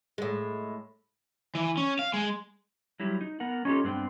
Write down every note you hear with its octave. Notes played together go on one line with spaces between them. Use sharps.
A2 G#3
E3
C#4
F5
G#3
F#3 G3 E4 G4
D#4
B3 A#4 F#5
C#4 D#4 F4 G4 A4
G2 B3 C4 D4 G5